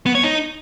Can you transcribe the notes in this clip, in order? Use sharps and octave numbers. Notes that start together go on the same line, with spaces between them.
B3
C#5
D#4